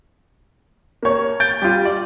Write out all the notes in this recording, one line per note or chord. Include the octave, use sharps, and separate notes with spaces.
A#3 C#5
G6 A6 D7
G3 F4
D5